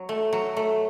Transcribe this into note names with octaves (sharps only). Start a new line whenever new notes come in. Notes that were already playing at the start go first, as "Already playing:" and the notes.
Already playing: F#3
A3
F#3
A3